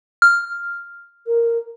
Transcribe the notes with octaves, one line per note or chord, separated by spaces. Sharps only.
F6
A#4